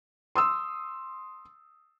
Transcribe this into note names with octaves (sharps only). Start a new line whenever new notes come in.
C6 D#6 E6